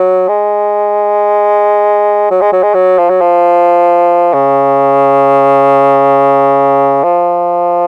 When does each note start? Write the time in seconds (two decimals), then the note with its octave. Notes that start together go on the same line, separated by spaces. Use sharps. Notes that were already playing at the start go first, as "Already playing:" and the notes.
Already playing: F#3
0.29 G#3
2.31 F#3
2.42 G#3
2.53 F#3
2.63 G#3
2.74 F#3
2.98 F3
3.10 F#3
3.21 F3
4.34 C#3
7.04 F3